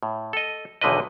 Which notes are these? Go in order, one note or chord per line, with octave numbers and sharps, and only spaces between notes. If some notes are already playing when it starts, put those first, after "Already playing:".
A2
A4 D#5
B1 E2 D3 D#3 B4 D#5